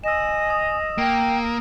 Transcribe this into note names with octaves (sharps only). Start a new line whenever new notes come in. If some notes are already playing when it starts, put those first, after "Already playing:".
D#5 G#5 E6 E7
D#6
A#3 G5 D7